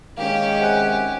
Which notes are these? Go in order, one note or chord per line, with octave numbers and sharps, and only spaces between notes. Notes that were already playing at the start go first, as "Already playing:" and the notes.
D#3 G#3 A#3 C#4 G4
C3 F#5 G#5 F#6